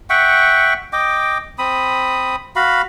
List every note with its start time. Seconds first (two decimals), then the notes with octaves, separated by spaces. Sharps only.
0.10 E5 F#5 G5 C#6
0.93 D#5 G5 D6
1.59 C4 B5 D#6
2.56 F#4 F5 B5